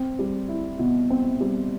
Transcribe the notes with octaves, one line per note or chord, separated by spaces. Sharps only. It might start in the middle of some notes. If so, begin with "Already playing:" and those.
Already playing: C4
G3
E4
B2
C4
G3